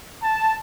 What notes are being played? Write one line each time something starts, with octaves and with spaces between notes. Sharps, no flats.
A5